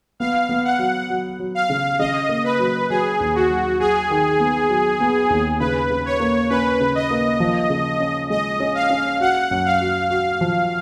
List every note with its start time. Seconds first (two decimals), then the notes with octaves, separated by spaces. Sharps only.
0.20 B3 F5
0.49 B3
0.65 F#5
0.79 F#3
1.10 F#3
1.39 F#3
1.55 F5
1.70 C#3
1.99 C#3 D#5
2.29 A#3
2.44 B4
2.59 F#3
2.90 F#3 G#4
3.20 D#2
3.35 F#4
3.50 F#3
3.80 F#3 G#4
4.10 D#3
4.40 B3
4.70 F#3
5.00 B3
5.30 D#2
5.59 C#3 B4
5.90 C#3
6.06 C#5
6.20 A#3
6.49 C#4 B4
6.80 C#3
6.95 D#5
7.11 A#3
7.40 F3
7.70 C#3
8.00 C#4
8.30 G#3 D#5
8.60 C#4
8.75 F5
8.90 C#4
9.20 F#4 F#5
9.51 F#2
9.65 F5
9.81 F#4
10.10 F#4 F5
10.41 F3